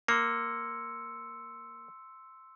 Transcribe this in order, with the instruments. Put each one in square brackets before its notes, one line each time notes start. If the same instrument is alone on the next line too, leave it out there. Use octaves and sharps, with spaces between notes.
[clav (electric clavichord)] A#3 [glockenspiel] C6 E6 C#7